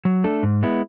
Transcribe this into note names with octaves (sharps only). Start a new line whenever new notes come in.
F#3
A3 D4 A4
G#2
G#3 B3 E4